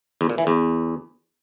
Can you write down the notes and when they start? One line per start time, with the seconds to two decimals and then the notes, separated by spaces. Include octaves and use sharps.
0.21 E2
0.29 A#2
0.38 E3
0.47 E2